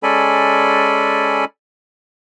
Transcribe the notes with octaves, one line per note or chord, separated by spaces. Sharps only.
G#3 C#4 A4 D5 G#5 B5